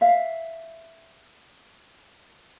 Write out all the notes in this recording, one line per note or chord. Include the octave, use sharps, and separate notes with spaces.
E5 F5